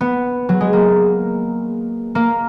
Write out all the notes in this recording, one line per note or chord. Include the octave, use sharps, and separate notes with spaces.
B3
F#3
G#3
A#3
A#3